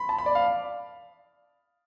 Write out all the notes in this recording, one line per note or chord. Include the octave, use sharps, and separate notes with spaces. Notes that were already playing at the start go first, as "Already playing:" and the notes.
Already playing: B5 C6
A5
B5
D5
F5